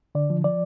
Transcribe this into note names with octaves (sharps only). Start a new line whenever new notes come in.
D3 D5
F3
F3 D5